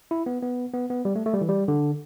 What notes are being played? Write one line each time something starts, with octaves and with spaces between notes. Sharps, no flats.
E4
B3
B3
B3
B3
G3
A3
A3
G3
E3
G3
D3